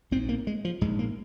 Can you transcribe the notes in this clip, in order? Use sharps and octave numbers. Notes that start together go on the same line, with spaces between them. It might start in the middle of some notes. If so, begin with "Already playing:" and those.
A#1 G#2 C4
A#3
G#3
F3
A#1 G#2 G#3
A#3